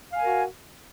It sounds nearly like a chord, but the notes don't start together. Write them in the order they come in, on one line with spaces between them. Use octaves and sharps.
F5 G#5 A#4 F#4